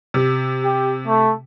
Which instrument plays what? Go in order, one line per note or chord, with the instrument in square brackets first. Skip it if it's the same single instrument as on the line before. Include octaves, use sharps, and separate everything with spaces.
[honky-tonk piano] C3
[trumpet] G4
A3